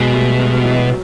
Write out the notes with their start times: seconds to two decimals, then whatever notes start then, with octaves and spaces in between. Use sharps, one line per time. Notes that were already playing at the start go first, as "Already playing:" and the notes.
Already playing: B2 F#3 G#3
0.14 G3 A3
0.39 F#3 G#3
0.63 E3 F#3
0.88 F#3